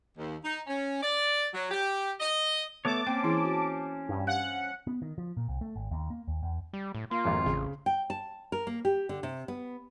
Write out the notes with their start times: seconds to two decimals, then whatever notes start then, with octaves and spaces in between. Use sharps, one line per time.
0.17 D#2
0.45 D#4
0.67 C#4
1.02 D5
1.53 F#3
1.71 G4
2.20 D#5
2.85 A3 B3 C#5 A5 D6
3.07 A#3 C4 C#4 C5 G5
3.24 E3 E4 G#4
3.44 F#4
4.09 G2
4.27 F5 F#5
4.87 B3
5.02 D#3
5.18 F3
5.37 A#2
5.48 C2
5.61 A3
5.76 G#1
5.91 D#2
6.10 A#3
6.27 D#2
6.43 E2
6.73 G3
6.95 A2
7.11 A#3 F4
7.25 G#1 F2
7.46 A1 C#3
7.86 G5
8.10 A5
8.52 A#4
8.67 A#3
8.85 G4
9.09 D3
9.23 C3
9.48 B3